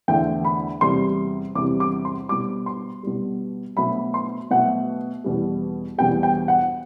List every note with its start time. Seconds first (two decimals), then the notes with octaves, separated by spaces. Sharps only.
0.08 E2 D3 A3 G5
0.45 B5
0.81 E2 C3 G3 C6
1.55 E2 C3 G3 D6
1.80 D6
2.05 C6
2.29 B2 G3 D6
2.66 C6
3.03 B2 G3
3.77 B2 F#3 A3 B5
4.14 C6
4.51 B2 F#3 A3 F#5
5.24 E2 B2 G3
5.98 E2 B2 G3 G5
6.23 G5
6.48 F#5